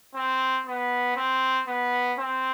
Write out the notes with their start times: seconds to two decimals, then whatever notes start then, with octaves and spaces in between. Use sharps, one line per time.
0.15 C4
0.66 B3
1.16 C4
1.68 B3
2.18 C4